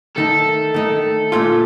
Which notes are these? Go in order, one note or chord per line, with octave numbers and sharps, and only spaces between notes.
D#3 A3 D#4 A4
D#3 A3 D#4
A#2 A3 C#4 F4